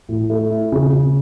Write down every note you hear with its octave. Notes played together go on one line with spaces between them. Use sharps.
A2
A3
E4
C#3
C#3